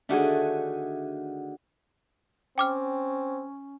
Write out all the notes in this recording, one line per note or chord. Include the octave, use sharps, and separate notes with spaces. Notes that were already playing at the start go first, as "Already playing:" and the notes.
D3 D#3 A3 D4 F#4 G#4
C4 C#4 G5 D6 F6